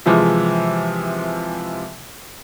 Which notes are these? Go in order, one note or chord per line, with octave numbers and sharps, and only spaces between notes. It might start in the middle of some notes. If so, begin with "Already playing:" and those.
C3 E3 F3 G#3